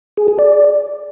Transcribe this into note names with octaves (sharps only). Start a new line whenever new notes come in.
G#4
G#4
D5